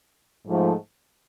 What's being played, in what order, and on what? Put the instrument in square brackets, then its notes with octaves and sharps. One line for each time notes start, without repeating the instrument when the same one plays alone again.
[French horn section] G#2 F3 A3